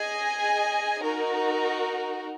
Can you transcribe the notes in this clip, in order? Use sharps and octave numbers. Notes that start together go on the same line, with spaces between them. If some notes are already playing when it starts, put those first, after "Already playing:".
Already playing: G#4 D#5 G#5
D#4 F#4 A#4